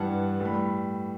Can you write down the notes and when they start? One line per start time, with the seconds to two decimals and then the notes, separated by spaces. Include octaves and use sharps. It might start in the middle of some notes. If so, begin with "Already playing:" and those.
Already playing: G2 E3 G3 F#5 A5
0.40 A2 G3
0.45 B5